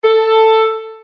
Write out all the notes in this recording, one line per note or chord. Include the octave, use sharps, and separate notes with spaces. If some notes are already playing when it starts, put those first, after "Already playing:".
A4